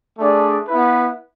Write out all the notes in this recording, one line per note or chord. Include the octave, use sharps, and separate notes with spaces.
A3 D4 G#4 D5
B3 E4 B4